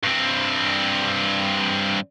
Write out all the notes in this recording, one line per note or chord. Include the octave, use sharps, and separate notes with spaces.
G2 C4